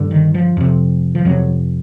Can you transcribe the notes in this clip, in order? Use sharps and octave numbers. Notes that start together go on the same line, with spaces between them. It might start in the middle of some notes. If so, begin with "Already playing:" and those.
Already playing: G2 D3
D#3
F3
F2 C3
F3
F2 C3 F#3